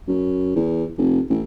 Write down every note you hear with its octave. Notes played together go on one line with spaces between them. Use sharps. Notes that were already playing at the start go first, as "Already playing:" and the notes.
F#2
E2
F1
A1